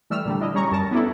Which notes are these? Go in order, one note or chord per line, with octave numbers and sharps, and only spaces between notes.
E3 G3 A3 E6 F6
A#2 D3 G3
D4 E4 D#5
G3 C#4 A#5 C#6
F#2 A#4 A5 A#6
B3 C#4 D4 E4 A4